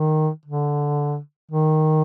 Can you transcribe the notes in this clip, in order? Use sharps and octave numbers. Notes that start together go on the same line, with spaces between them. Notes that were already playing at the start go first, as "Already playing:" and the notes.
Already playing: D#3
D3
D#3